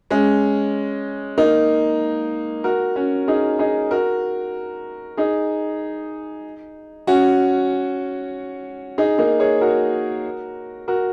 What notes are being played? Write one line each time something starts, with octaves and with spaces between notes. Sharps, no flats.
G#3 C#4
A#3 D#4
F#4 A#4
C#4 F#4
D#4 G#4
D#4 G#4
F#4 A#4
D#4 G#4
C#4 F#4
D#4 G#4
A#3 D#4
G#4 C#5
F#4 A#4
F#4 A#4